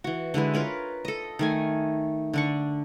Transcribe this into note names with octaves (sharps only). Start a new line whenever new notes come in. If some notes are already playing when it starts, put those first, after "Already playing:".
E3 F#4
D3 G#3 E4 B4
F4 A#4 B4 C#5
A4 D#5
D#3 A3 G#5
D3 D4 C#6